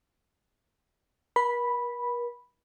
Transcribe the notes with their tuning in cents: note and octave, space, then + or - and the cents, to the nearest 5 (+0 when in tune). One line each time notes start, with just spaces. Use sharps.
A#4 +45 B5 -5